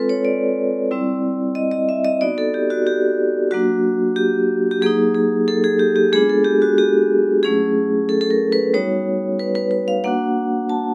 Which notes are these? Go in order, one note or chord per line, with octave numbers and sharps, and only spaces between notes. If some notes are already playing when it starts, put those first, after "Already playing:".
Already playing: G#3 C4 F4 A4 B4
C#5
D5
G3 C4 E4
D#5
D#5
E5
D#5
B3 D#4 F#4 D5
A4
G4
F#4
G4
F#3 A#3 D4 F#4
G4
G4
F#3 A#3 D#4 G#4
G#4
A4
G#4
G4
G4
G#3 B3 D4 F4 G#4
A4
G4
F#4
G4
F#3 A3 C#4 E4 G#4
A4
A4
A#4
B4
G3 B3 D#4 F#4 C#5
B4
B4
B4
F5
A#3 D4 F#4 F#5
A5